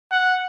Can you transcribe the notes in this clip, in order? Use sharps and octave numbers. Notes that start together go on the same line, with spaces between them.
F#5